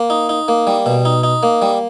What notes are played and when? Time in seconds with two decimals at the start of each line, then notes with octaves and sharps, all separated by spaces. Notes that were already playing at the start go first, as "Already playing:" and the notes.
Already playing: A#3
0.10 D#4
0.29 D#4
0.48 A#3
0.67 G3
0.86 B2
1.05 D#4
1.23 D#4
1.43 A#3
1.62 G3